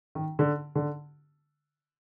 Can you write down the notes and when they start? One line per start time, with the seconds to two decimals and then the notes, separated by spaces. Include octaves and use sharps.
0.15 D#3
0.39 D3
0.75 D3